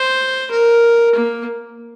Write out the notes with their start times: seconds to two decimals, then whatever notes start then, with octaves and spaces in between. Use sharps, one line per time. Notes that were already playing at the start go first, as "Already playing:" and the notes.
Already playing: C5
0.51 A#4
1.15 A#3